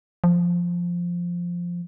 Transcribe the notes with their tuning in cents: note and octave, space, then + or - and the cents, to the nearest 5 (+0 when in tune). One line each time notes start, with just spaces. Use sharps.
F3 +0